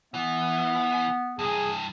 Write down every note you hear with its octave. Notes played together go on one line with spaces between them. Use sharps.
E3 B3 E5
G2 E3 G#4